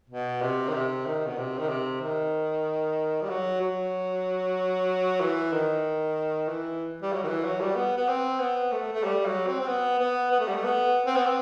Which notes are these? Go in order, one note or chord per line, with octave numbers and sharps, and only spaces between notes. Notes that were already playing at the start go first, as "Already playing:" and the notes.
B2
C3
D#3
C3
D#3
B2
C3
D#3
C3
D#3
G3
F#3
F#3
E3
D#3
E3
G3
F#3
D#3
E3
F#3
G3
B3
B3
C4
B3
A3
A3
G3
F#3
C4
C4
B3
B3
B3
A3
G3
A3
B3
C4
B3
C4